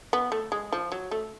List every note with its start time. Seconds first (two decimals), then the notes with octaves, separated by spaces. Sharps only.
0.13 B3
0.32 A3
0.52 G#3
0.73 F3
0.92 F#3
1.11 A3